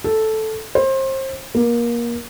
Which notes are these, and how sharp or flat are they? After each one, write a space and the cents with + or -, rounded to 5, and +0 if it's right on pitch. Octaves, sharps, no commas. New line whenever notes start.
A4 -5
C5 +30
A#3 +25